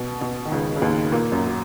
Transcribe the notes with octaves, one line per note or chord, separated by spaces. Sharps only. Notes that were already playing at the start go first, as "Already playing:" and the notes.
Already playing: B2
B2
D#3
C#2 C#3
C#3
D#2 D#3
A#2 A#3
F#2 F#3
F#3